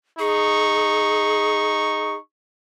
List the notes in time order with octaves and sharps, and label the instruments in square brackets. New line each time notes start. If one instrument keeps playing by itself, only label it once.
[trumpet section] D#4 C#6 [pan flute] G#4